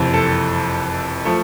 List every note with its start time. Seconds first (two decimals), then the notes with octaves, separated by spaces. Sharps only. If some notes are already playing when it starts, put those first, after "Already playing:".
Already playing: F#1 F2 C3 E3
0.14 A4
1.25 F3 A3